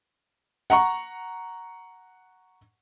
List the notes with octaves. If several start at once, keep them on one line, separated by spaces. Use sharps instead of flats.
F#5 A#5 C#6